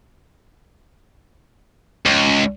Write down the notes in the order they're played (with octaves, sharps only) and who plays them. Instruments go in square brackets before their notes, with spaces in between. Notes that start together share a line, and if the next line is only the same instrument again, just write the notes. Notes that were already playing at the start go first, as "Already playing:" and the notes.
[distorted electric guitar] C#2